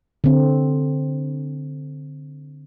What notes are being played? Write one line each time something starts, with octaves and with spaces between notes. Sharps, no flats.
D3 C4